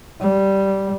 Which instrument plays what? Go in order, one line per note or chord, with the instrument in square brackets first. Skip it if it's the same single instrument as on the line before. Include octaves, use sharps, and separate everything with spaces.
[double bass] G3